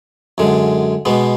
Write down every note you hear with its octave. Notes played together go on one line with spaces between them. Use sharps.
F#2 D3 G#3
B2 G#3 B3